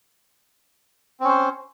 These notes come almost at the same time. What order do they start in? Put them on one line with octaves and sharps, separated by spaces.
C4 C#4 C5